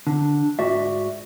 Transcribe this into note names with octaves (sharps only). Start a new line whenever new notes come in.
D3
G#2 F#4 D5 E5